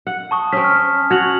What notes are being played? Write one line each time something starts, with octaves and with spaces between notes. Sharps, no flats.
F#5
A5 C#6 D#6
C4 C#4 B6
F6
F#4 G#6 F7 F#7